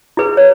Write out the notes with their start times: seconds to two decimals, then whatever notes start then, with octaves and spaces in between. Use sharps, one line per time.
0.17 E4 G#4 B4
0.37 C#5